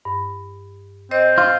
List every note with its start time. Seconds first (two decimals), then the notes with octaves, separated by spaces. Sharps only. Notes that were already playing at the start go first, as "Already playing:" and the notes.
0.05 G2
1.11 C4 C5 D#5
1.38 F4